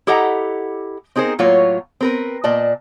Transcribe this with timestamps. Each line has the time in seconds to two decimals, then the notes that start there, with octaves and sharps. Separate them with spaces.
0.07 E4 G4 A4 D#5 F#5 A#5
1.16 C4 D#4 G#4 A#4 C5
1.39 A2 F#3 A#3 F4 C#5
2.01 C4 A#4 B4
2.44 A#2 D5 D#5 A5